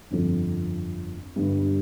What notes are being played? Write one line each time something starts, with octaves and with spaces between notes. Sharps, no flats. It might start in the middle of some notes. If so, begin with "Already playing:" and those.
G1 F2 F3 C4
G1 G2 G3